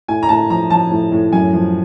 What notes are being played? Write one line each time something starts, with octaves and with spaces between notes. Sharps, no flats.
A2 G#5
A#5
A2 A5
F3 A#5
F3 A5
A2
A2
F#2 G#5
F3